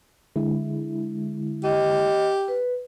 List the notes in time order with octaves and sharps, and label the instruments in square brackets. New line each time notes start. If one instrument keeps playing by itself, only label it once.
[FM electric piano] D3 G#3 E4
[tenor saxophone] G4 [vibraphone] D#5
[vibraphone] B4